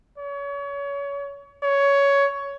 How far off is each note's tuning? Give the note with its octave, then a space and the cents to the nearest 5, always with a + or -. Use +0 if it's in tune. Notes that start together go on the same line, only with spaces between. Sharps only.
C#5 +30
C#5 +15